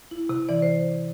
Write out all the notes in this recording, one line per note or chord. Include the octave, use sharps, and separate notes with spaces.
E4
C3
E3 D5
C5